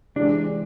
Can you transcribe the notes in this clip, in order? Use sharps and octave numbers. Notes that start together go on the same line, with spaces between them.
C3 E3 G#3 D4